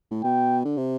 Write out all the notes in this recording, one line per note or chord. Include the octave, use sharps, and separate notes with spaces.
A2
B2 G5
D3
C3